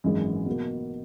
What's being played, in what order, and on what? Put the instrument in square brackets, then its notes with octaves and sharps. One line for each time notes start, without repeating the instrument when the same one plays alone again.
[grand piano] G#1 F#2 E3 G#3
B2 F#3 A#3